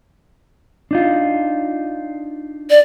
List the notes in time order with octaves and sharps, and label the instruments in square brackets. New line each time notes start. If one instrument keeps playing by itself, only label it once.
[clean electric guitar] D4 D#4 F4
[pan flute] D5